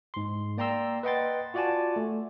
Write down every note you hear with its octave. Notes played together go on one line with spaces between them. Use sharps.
G#2 C6
A#3 D5 G5 A#5 C6 E6
B4 D#5 F#5 G5 C6 A6
F4 F#4 D5 F#5 G#5 A5
A3